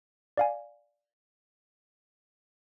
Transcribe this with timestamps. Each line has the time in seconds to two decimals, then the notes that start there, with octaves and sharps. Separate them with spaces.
0.37 D5 F5 G#5